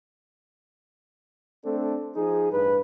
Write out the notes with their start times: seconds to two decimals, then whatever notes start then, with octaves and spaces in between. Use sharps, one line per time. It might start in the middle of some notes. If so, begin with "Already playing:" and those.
1.65 A3 C4 D4 A4
2.16 F3 D#4 G#4
2.52 A1 G2 B4